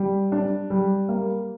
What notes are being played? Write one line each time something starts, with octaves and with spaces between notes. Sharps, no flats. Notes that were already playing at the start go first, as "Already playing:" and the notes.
Already playing: G3
D4
G3
A#3